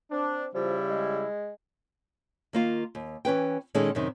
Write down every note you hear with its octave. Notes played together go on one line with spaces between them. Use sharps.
C4 D4
C#3 F3 G3 E4
G#3
D#3 A#3 F4
D#2
E3 C#4 B4 G5
A#2 D#3 G#3 C#4 D#4 A4
F#2 C3 D#3